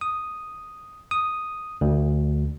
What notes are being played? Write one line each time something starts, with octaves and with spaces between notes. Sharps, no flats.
D#6
D#6
D2